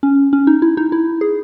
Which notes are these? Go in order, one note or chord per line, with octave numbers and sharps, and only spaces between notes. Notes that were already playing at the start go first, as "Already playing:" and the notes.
C#4
C#4
D#4
E4
D#4
E4
G#4